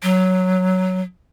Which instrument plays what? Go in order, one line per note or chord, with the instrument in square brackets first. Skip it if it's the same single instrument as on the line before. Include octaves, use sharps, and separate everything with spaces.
[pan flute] F#3